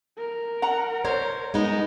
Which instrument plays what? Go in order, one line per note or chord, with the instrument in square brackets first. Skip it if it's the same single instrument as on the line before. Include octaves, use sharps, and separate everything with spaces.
[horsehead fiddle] A#4
[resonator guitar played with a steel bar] F#5 A#5
[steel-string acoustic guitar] C5 [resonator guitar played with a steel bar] C#5
[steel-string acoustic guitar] G#3 B3 D#4